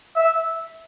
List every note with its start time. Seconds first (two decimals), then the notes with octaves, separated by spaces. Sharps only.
0.16 E5